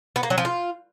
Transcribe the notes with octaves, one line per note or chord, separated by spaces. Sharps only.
B3
A#3
F#3
F3
F4